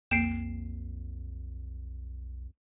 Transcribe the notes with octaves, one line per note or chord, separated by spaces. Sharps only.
B1 F2 A#3 C7 D7 E7